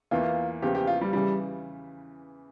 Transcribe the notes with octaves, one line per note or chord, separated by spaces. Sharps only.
E2 E3 A#3 F4
E2 C#3 F3 A#3 G4
G4
F4
G3
C#3 E3 G3